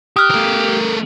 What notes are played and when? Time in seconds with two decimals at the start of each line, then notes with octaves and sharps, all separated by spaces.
0.16 G4 D#6 F6 F#6
0.30 A3 A#4